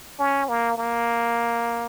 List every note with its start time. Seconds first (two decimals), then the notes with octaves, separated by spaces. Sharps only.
0.19 C#4
0.49 A#3
0.78 A#3